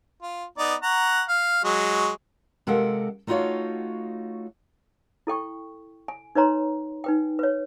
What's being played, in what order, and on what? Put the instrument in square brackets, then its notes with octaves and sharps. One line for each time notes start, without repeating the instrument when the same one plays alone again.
[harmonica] F4
B3 D#4 D5
F#5 A#5 C#6
F5
F#3 G#3 C#6
[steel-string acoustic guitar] C3 G#3 A4 A#4 F5 F#5
A3 D#4 F4 F#4 C#5 F5
[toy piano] E4 A4 G5 C#6
G#5
D#4 B4 C#5 A#5 C6
D#4 B4 G5
B4 C#5